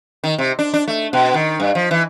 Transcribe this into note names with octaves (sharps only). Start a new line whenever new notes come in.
D#3
C3
D4
D4
A3
B2
D#3
G2
F3
E3